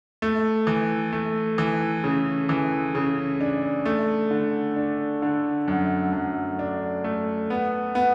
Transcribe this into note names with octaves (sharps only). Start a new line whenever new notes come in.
A3
E3
A3
E3
C#3
E3
C#3
D4
A3
D3
D4
D3
F#2
F#2
D4
A3
B3
B3